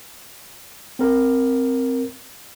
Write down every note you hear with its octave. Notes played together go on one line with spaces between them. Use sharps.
C4 A#4